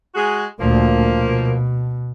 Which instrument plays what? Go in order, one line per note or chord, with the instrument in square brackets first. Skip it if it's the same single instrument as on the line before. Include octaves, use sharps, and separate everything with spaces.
[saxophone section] G#3 F#4 G#4
[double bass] D2 A#2 [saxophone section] F3 A#3
[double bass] B2